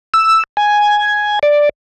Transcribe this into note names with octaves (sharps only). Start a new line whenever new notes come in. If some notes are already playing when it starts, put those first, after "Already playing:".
E6
G#5
D5